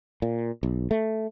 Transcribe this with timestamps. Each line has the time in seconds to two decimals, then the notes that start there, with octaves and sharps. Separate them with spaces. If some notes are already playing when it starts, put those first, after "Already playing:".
0.22 A#2
0.63 B1
0.91 A3